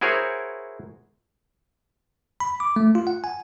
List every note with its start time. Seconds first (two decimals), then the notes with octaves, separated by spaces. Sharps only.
0.01 E4 F#4 G#4 A#4 C5 C#5
2.40 B5
2.60 D6
2.76 A3
2.95 F4
3.07 F#5
3.24 G#5